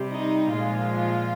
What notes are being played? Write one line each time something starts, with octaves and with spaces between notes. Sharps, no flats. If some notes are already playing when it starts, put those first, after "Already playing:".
Already playing: C3 G3
D#4
A#2 F3 G#3 F4